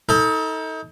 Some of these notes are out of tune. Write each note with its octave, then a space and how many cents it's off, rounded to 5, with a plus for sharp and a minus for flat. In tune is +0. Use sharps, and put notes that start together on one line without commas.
D#4 +35 A4 +20